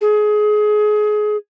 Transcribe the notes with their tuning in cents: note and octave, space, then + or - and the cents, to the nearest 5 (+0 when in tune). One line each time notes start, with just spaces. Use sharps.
G#4 +25